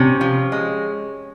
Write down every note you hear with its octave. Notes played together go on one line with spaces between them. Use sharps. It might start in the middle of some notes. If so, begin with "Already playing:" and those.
Already playing: C3 C#4
F3
G#3